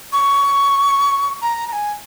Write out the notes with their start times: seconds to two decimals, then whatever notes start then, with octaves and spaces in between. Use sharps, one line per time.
0.13 C#6
1.42 A#5
1.68 A#5
1.73 G#5